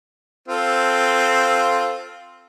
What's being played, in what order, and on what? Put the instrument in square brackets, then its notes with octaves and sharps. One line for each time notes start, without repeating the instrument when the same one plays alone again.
[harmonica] C4 F4 A4